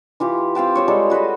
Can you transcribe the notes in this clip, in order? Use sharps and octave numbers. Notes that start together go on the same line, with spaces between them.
E3 F4 G4
C4 F5 G5 A5
G4 C5 C#5
G3 G#3 A4
F#4 B4 C5 D#5